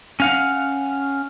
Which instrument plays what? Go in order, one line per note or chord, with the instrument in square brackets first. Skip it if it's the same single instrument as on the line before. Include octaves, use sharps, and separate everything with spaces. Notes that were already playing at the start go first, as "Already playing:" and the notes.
[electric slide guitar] C#4 F5 F#5